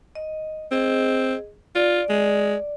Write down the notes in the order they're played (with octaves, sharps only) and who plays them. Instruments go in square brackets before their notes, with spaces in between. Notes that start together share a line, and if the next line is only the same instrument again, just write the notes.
[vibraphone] D#5
[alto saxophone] C4 [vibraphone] G#4 D#5
[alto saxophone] F4 [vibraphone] D5
[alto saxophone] G#3